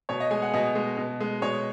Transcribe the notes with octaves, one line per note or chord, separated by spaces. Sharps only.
B2 C#5
D#5
G#3 G#5
F#5
B2 D#5
G#3
B2
G#3
B2 C#5